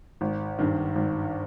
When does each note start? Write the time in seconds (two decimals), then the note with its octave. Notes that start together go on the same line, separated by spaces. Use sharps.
0.21 G#1
0.59 G2 D#3
0.95 G#1